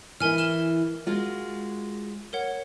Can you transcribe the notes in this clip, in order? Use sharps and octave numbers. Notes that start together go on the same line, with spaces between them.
E3 E4 A#4 G#5 F6
F6 E7 G7
G#3 F4 F#4
A#4 C#5 F#5